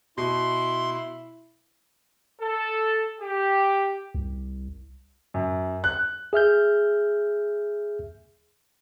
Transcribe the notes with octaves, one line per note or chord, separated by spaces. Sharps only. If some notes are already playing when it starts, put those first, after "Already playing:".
B2 E4 C6
A4
G4
C2
F#2
F#6
G#4 E5 F6 G6